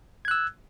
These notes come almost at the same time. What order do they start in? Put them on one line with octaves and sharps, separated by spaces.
G#6 F#6 E6